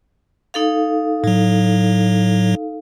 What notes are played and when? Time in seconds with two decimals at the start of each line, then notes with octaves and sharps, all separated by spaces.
0.54 D#4 A4 F5
1.24 A2 F#3